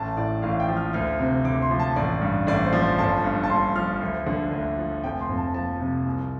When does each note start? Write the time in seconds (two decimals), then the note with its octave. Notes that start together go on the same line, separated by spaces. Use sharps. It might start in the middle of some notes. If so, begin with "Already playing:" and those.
Already playing: A1 A5
0.17 A2 D5
0.42 A1 F5
0.60 G5
0.68 F3
0.77 F6
0.93 D2 F6
1.19 C3
1.45 D2 D6
1.62 C6
1.70 F3
1.80 A5
1.96 A1 D5
2.21 G2
2.47 A1 D5
2.65 C5
2.73 F3
2.82 C5
2.98 G1 A5
3.24 G2
3.44 A5
3.49 G1 C6
3.76 F3 F6
4.01 D2
4.26 D3
4.52 D2
4.78 F3
5.03 F1 G5
5.20 C6
5.29 F2
5.37 A5
5.54 F3 A5
5.80 C3
6.05 C2